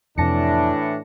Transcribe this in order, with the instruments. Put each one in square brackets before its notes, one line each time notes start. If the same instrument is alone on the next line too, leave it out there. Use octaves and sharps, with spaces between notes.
[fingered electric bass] F2 C3 [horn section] A2 E3 D4 [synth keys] A5 A#6 C#7